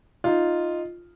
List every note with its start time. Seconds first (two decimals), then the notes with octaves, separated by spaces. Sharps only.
0.24 D#4 F4